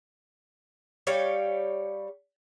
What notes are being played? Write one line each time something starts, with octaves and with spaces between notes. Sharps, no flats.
G3 C#5 F5 G5